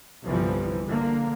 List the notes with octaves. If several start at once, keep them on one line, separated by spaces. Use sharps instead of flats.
G1 C2 E3 F3 G3
D3 A#3